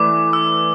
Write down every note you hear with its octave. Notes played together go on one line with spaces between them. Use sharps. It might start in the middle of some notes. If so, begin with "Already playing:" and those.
Already playing: E3 A3 B4 D5 D6
E6